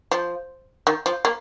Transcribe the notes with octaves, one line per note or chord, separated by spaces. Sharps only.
F3
D#3
F3
A#3